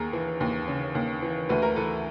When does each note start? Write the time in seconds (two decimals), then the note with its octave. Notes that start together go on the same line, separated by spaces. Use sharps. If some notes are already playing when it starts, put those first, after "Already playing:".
Already playing: D#2 G#4 A#4
0.13 E3
0.40 D#2
0.68 C#3
0.95 D#2
1.22 E3
1.49 D2 B4
1.62 A#4
1.76 E3 A4 B4